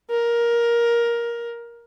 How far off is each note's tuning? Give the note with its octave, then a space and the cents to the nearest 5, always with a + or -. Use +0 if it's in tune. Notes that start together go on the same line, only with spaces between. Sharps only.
A#4 +15